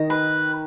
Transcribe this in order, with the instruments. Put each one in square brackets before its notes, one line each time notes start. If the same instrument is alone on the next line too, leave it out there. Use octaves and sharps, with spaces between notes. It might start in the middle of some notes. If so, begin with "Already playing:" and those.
Already playing: [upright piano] D#3 [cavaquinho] D#5
[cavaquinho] B4